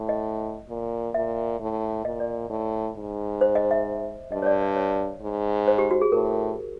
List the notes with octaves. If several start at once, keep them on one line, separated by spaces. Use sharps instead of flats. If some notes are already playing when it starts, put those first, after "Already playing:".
Already playing: A2
D#5
A#2
A#2 E5
A2
A#2 D#5
D5
A2
G#2
C5
D#5
E5
G2 D#5
C#5
D5
D5
C#5
G#2
C5
G4
F#4
G#4
A2 A#4